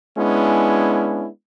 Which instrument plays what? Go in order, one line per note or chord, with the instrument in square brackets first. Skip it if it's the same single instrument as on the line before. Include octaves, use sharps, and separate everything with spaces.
[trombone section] G#3 B3 C#4 D4 E4